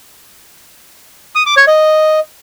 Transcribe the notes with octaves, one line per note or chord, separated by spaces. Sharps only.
D#6
D6
C#5
D#5